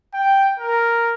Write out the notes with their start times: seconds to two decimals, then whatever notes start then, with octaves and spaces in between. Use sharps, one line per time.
0.14 G5
0.60 A#4